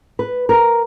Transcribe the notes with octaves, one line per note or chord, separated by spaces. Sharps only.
B4
A#4